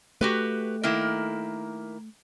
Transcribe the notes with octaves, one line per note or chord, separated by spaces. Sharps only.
A3 F#4 G4 B4
D#3 A#3 E4